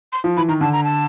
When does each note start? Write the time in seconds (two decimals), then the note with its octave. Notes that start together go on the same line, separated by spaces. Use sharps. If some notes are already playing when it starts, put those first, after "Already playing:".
0.12 C6
0.24 F3
0.37 E3 B5
0.49 D#3 A#5
0.61 D3 A5
0.73 A#5
0.84 A5